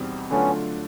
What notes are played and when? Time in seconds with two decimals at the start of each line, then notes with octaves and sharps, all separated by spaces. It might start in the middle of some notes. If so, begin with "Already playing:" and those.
Already playing: E2 B2 G3 C4 D#4
0.30 D3 F#3 A3 B3 C#4 D4 F4